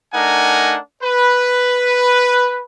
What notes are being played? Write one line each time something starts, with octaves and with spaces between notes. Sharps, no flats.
A3 D4 D#4 A#4 F#5 G#5
B4